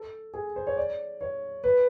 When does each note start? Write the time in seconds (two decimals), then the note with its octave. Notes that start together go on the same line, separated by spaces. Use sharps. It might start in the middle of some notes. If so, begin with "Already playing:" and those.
Already playing: A4
0.34 G#4
0.56 C5
0.67 C#5
0.77 D5
1.21 C#5
1.64 B4